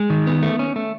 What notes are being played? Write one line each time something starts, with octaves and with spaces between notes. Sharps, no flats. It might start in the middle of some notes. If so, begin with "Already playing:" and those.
Already playing: G#3
D#3
B3
A3
C#4
A3